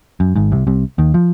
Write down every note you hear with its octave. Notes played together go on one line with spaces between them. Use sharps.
F#2
G#1 G#2
C2 C3
C2 C3
D#2 D#3
F3